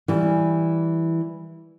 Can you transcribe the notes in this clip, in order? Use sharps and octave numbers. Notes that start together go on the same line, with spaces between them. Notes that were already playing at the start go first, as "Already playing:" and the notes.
E3 G3